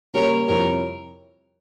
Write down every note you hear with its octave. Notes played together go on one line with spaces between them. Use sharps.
C#3 G3 A#3 A#4 C#5
F2 C3 G3 C4 E4 A#4 C#5